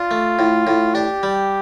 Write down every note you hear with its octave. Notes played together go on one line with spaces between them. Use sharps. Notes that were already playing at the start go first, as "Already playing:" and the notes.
Already playing: D4 F4
A3
A2
A2
D4 G4
G3